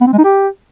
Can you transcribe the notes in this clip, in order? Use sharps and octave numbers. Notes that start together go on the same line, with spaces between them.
B3
C4
G#3
D#4
G4